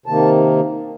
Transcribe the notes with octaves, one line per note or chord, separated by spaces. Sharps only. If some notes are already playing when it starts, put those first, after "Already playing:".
C3 D#3 A#3 A5